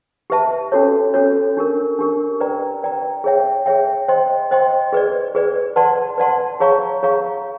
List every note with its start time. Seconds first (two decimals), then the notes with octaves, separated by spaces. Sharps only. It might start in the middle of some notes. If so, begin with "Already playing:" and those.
0.30 G4 B4 E5 A5
0.72 C#4 F#4 A4 C#5
1.14 C#4 F#4 A4 C#5
1.57 D4 G4 A#4
1.99 D4 G4 A#4
2.40 B4 D5 G5 A#5
2.83 B4 D5 G5 A#5
3.24 G#4 C#5 E5 G5
3.66 G#4 C#5 E5 G5
4.08 C5 D#5 G5 C6
4.51 C5 D#5 G5 C6
4.93 G#4 B4 D5
5.35 G#4 B4 D5
5.76 B4 D5 F#5 A5 C6
6.18 B4 D5 F#5 A5 C6
6.60 G#4 C#5 F5 A#5 C#6
7.03 G#4 C#5 F5 A#5 C#6